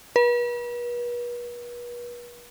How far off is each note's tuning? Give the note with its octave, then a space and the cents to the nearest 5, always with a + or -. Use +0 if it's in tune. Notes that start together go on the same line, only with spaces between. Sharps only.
B4 -40